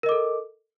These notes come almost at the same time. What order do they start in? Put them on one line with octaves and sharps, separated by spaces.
A#4 D#5 D6 A4